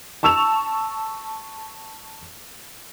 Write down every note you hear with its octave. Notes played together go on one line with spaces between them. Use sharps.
A5 C#6 E6 E7 F7